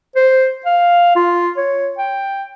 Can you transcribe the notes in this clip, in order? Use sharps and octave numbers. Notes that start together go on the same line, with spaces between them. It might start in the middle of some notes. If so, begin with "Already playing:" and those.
C5
F5
F4
C#5
G5